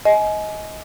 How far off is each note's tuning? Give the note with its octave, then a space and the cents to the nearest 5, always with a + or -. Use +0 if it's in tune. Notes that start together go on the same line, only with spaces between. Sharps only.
D#5 +20 G#5 +25